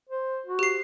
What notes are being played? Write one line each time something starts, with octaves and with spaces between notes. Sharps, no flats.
C5
F#4
G4 C7